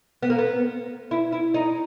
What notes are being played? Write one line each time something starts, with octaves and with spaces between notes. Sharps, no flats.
B3
A#3
B3
E4
E4
D#4